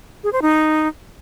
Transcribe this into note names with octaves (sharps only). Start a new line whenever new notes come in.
G#4
C5
D#4